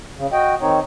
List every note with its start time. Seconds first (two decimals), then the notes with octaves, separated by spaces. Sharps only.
0.17 C#3
0.33 F#4 D#5 G5
0.61 D#3 C4 D#4 C#5